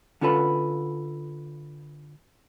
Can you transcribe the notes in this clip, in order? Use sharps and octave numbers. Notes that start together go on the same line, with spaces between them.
D3 C#4 F4 A4 B4